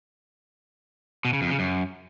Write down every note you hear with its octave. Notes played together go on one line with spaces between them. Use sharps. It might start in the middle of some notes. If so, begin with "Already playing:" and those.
B2
C#3
F2
C#3
F#2